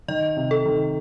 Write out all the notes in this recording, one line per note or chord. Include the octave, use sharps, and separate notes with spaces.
D#3 D#5
C3
A4
D#3